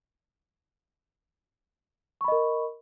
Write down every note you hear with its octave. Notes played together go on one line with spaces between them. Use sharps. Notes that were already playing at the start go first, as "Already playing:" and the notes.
A#4 D#5 B5 C#6